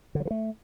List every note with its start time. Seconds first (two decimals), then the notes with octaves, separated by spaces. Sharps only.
0.15 D3
0.20 F#3
0.25 E3
0.31 A3